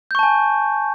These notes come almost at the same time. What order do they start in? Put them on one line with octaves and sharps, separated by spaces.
G6 C#6 A5 G#5